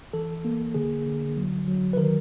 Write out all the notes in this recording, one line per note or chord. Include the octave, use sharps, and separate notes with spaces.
E3 A4
A#3
D3 G#4
D3
F#3
F#3
B4
D#3 A#4